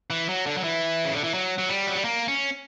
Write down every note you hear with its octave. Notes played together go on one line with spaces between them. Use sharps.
E3
F#3
D3
F#3
E3
C#3
D3
E3
F#3
F#3
G3
F#3
G3
A#3
C#4